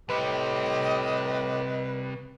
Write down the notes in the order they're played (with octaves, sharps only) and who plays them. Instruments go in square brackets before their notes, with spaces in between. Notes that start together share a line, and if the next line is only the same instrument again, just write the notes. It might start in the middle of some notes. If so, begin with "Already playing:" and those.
[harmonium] A2 G4 [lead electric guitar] C3 G3 [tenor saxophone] B4 [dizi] D#5